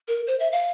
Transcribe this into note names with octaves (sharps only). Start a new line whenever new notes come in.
A#4
C5
E5
F5